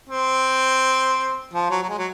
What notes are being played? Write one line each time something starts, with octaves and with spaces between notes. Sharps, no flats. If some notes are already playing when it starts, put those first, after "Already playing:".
C4
F3
F#3
F#3
G#3
F#3